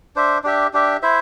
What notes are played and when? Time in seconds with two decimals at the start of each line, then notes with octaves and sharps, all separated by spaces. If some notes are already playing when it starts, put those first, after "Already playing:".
0.16 D4 C5 E5
0.44 D4 G4 E5
0.73 D4 G4 E5
1.02 E4 C5 E5